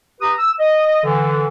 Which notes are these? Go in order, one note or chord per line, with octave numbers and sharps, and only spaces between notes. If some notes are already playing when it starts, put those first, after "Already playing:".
G4 B4 A#5 D#6
E6
D#5
D3 E3